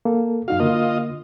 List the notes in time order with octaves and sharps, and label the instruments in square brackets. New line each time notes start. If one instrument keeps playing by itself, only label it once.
[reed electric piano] A#3 A4
[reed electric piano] F#2 D#4 F#4 [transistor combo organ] F5
[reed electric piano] D3 A#3 [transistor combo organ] F4 D#5